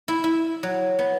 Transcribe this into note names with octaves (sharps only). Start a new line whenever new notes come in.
E4
E4
F#3
B3